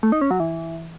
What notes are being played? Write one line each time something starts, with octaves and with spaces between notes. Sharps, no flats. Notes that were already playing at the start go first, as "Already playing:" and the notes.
A3
D#4
C#4
F#3
E3